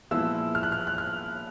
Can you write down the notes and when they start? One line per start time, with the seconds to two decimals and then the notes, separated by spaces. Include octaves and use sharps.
0.11 A#2 F3 G#3 B3 E4 E6
0.55 F6
0.63 F#6
0.72 F6
0.87 F#6
0.98 F6